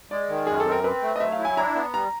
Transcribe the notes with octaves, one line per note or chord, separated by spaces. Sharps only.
G#3 D5
D#3
F#2 G#4
A4
C4
A#4
C4 B4
A3
D#5
F#3 E5
F5
E4
G#5
D4 A#5
B3
G3 A#5